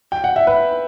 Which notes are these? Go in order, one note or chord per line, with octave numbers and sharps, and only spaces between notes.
G5
F#5
E5
B4